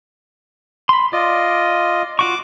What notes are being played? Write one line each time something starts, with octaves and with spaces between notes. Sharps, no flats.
B5 C6
F4 D5 D#5
F4 F#4 C#6 D6